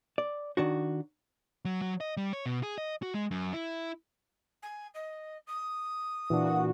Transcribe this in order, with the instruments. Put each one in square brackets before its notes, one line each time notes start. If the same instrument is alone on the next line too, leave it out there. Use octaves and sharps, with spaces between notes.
[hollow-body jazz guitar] D5
D#3 D4 F#4
[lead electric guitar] F#3
F#3
D#5
G3
C#5
B2
G#4
D#5
F#4
G#3
F#2
E4
[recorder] G#5
D#5
D#6
[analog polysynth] A#2 F#4 [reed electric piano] E3 D4